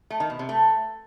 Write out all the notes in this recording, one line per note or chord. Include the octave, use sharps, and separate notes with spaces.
A3
D#3
B2
C3
A3